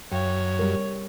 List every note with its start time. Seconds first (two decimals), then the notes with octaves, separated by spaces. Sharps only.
0.12 F#2 C#5 F5 G5
0.59 G3 A#4